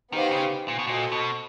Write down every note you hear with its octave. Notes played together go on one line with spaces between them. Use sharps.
D#3 B3 D#4 G4 C5 F5
C#3
A#2
B2
A#2 F#4 A4 C5 D#5
B2